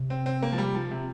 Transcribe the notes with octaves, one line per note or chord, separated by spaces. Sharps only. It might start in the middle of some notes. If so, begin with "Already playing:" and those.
Already playing: C3
C4
C4
A#3
F3
G3
F3
C3